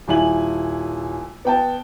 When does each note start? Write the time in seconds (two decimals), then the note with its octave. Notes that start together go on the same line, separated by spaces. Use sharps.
0.08 D#1 E4 G#5 F#7
1.45 B3 G5 A5